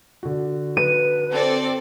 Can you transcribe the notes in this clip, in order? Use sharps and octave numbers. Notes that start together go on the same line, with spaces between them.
D3 F#4
B4 D#7
C4 A4 D5